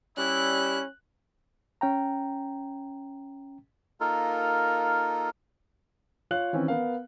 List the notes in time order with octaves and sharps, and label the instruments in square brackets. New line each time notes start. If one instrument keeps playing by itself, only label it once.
[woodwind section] G3 E4 [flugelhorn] C#4 [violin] F#6
[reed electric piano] C#4 G5 A#5
[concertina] A#3 D#4 F4 A4 A#4
[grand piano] F4 C#5 F5 F#6 F#7
D#3 E3 C4 C#4
B3 A#4 F5